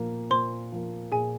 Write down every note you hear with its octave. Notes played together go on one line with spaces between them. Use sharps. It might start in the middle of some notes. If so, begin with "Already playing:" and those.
Already playing: A#2 F3 A#3
A#2 C5 C6
F3 A#3
A#2 G#4 G#5